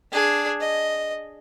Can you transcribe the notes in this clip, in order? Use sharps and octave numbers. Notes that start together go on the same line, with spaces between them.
D4 G#4
D#5